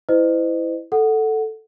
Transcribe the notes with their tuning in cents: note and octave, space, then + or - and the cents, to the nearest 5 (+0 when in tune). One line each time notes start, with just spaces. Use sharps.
E4 +0 C5 -45 D#5 -25
A4 +0 F#5 +0